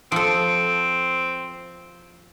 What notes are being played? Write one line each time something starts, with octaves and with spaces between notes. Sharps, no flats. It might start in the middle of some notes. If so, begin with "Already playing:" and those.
F3 C4 A4